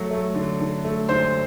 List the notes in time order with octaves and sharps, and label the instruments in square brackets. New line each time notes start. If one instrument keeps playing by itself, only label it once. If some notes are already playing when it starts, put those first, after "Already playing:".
Already playing: [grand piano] F#3 A3
A3
D3
D3
A3
D3 C5 C6